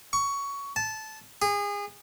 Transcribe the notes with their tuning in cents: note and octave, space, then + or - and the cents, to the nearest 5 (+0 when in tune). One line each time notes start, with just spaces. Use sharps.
C#6 +15
A5 -15
G#4 -30